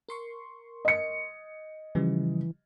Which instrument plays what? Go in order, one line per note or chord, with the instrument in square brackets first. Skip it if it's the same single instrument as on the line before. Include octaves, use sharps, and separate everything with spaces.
[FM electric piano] A#4 C6 C#6
[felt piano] D#5 C#7
[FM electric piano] C#3 F3 G3 [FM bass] E3